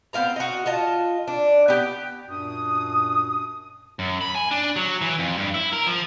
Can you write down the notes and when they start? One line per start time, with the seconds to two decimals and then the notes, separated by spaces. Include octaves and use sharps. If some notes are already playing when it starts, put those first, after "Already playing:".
0.13 B3 C4 F5 A#5
0.36 F#4 D#5
0.66 F4 D#5 A5
1.27 D4
1.68 B3 G4
2.28 F#2 A#2 D4 F#4 D#6
3.99 F#2
4.21 B5
4.35 G#5
4.51 D4
4.76 F#3
5.01 E3
5.19 F2
5.37 G2
5.54 E4
5.73 A#4
5.87 F3